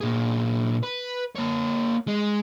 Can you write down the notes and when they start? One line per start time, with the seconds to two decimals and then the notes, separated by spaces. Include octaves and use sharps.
0.01 A#2 G#4
0.83 B4
1.36 A#3 C#5
2.07 G#3